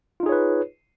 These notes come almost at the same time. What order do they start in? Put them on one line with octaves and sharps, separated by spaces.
F4 D#4 G#4 C#5 B4